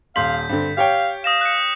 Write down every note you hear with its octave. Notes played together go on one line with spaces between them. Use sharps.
D#1 F5 C6 G6 B6 F#7
G2 D3 C4
G4 C#5 F5 G5
F5 D#6 A#6 E7
F#6 C#7